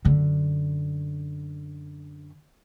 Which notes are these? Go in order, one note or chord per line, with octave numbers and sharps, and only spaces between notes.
F#2 D3